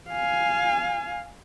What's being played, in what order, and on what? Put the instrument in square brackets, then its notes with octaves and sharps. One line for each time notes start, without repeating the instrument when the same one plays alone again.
[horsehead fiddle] F5 G#5